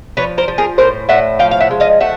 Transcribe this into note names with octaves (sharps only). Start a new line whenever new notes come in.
F3 B4 C#5
A#4 C5
F3
G#4 A#4
A2 A#4 C5
A2 E5 F#5
F3 F5 G5
F5
E5 F#5
G#3
D#5 F5
A3 E5 F#5